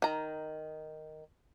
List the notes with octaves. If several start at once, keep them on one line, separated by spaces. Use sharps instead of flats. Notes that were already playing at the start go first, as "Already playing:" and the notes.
D#3 A#5